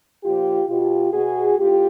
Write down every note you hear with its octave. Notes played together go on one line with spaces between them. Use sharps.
A#2 F3 F4 G4
B2 F4 G4
B2 F#4 G#4
A2 F4 G4